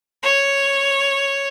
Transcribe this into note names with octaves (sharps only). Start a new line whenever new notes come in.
C#5